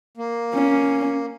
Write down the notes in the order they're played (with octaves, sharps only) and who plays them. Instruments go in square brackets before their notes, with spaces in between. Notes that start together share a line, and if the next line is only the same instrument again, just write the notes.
[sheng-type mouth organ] A#3
[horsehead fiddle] C#4